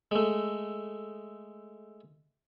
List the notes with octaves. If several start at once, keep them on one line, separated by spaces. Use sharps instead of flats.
G#3 A3